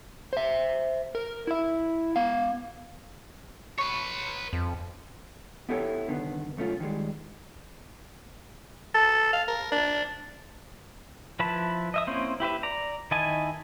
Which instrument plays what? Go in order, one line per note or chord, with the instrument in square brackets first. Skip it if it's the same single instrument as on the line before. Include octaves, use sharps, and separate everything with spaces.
[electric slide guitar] C5 E5
A#4
E4 E5
B3 F5
[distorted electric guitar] B4 C#5 [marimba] C#6
[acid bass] F2
[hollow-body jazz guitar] B3 E4 G4 A4 B4 C#5
C2 D3 D#3 B3
B1 A3 C#4 F4
D#3 F3 G3 G#3
[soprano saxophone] A4
F5
A#4
D4
[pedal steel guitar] F3 E4 B4 A5 B5
D#5 E5 D#6
A#3 C4 C#4 E4 C5
E4 G4 B4 E5
D5 A#5
D#3 E4 D#5 G#5 A5